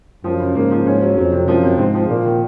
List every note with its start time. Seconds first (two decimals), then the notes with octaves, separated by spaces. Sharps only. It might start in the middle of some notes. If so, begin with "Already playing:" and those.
0.24 F#2 F3
0.40 C#3
0.55 G#2 A#3
0.71 F3
0.86 G#2 C#4
1.02 F#3
1.17 F2 F#3
1.32 C3
1.48 F#2 F3
1.63 C3
1.78 G#2 C4
1.94 F3
2.09 A#2 A#3
2.25 D#3